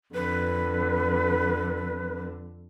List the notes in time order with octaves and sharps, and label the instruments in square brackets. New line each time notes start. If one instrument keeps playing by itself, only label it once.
[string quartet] F2 D3 [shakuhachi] B4